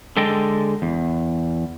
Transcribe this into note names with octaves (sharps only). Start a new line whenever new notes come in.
D3 G#3 A4 D#5 G5
E2